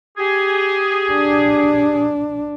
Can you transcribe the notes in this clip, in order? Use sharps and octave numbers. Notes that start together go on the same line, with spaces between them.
G4 G#4
D4